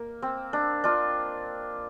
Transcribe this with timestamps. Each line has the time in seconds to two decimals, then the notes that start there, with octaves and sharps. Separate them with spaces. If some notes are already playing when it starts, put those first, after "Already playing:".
Already playing: A#3
0.22 C4
0.53 D4
0.84 D4 F4